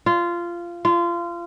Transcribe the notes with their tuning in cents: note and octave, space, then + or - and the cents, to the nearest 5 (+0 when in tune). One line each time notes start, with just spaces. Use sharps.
F4 -15
F4 -25